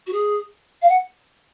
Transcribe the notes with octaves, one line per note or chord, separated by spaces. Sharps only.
F#4
G#4
F5
F#5